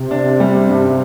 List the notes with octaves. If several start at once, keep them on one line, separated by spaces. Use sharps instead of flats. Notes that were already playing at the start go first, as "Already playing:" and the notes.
Already playing: C3
D4
G3
G2